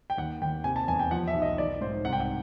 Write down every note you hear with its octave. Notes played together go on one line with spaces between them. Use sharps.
G5
D#2 F#5
D#2 G5
C3 G#5
A5
E2 G#5
G5
F3 F#5
E5
B1
D#5
D#3 D5
G#2 C5
C2 F#5
G5
F#5